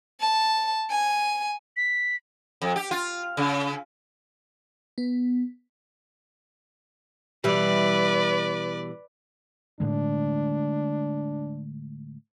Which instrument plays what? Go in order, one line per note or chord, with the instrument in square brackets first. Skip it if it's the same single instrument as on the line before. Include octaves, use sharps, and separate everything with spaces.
[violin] A5
G#5
[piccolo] B6
[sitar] F2
G4
F4
C#3
[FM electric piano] B3
[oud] B2 E3 G3 [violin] B4 D5
[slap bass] A2 D3 G#3 [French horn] D4